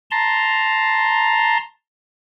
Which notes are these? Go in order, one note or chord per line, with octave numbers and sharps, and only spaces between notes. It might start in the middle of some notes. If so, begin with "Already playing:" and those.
A5 A#5 C6